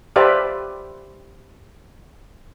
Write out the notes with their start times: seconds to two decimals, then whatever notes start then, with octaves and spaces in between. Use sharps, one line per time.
0.16 G4 B4 C5 D5 E5 F5